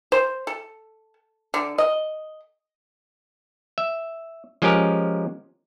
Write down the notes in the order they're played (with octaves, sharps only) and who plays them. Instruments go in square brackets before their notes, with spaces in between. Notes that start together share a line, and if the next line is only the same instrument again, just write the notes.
[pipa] C5
A4
D3
D#5
[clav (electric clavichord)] E5
F3 G#3 C#4 G4 A#4